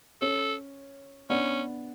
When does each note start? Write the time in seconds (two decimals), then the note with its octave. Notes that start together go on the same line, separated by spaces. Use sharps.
0.21 C#4 A4
1.30 B3 C#4 D4